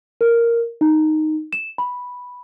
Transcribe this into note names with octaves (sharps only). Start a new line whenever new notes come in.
A#4
D#4
E7
B5